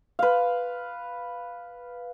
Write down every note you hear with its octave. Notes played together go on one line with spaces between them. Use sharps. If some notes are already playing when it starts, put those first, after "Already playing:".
B4 F5